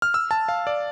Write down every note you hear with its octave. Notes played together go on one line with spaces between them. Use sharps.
F6
E6
A5
F5
D5